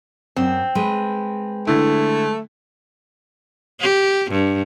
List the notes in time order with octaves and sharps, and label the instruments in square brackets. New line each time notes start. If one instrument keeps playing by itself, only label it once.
[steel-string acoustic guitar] F#2 [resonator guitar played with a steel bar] C4
[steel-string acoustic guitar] G#3 B4
[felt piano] D3 E4 [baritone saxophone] A3
[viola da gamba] G4
G2